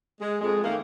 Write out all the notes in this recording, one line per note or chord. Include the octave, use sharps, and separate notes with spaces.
G#3
F2 G#3
D#3 A3 A#3